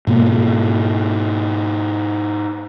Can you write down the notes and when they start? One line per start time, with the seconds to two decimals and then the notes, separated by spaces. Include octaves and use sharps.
0.07 G#2 B2 A#3